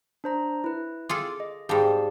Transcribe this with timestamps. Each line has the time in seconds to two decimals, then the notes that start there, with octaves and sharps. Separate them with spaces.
0.24 D4 C5 A#5
0.64 E4 B4
1.09 F4 G#4 A4 D6
1.40 D#5
1.69 G#2 G3 G#4 F5 A5